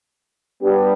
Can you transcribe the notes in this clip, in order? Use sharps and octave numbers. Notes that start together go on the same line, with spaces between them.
G3 B3 D4 G4